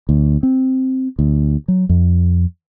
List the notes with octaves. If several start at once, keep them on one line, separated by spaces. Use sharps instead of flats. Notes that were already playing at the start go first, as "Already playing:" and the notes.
D2
C4
D2
F#3
F2